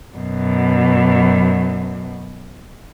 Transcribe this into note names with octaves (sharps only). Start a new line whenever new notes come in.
F#2 B2